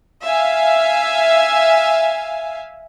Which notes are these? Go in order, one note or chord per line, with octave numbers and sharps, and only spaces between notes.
E5 F5 G#5